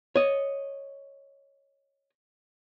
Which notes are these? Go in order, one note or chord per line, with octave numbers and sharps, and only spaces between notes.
C#5 D#5